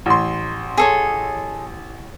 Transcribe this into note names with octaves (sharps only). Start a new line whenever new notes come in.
A1 C6
G#4 A4 C#5